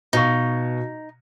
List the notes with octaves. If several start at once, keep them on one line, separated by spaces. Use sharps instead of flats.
B2 D#4 F5 C#6